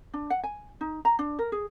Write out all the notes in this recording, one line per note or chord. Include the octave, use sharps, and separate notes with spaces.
D4
F#5
G#5
D#4
A#5
D4
A#4
G#4